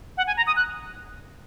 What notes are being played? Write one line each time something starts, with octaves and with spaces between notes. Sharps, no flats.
F#5
G#5
A#5
D#6
F#6